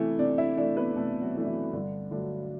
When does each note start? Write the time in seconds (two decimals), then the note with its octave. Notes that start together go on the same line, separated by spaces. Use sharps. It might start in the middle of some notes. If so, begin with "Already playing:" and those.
Already playing: C3 E3 A3 E4
0.19 C3 D4 D5
0.38 E4 E5
0.57 E3 A3 D4 D5
0.76 B3 B4
0.95 C3 A3 A4
1.21 F#3 F#4
1.35 E3 A3 D4
1.47 E3 E4
1.73 G2 D3 D4
2.11 D3 F#3 A3 D4